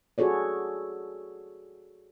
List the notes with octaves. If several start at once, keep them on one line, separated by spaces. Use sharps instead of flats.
F#4 G#4 A4 C#5 D5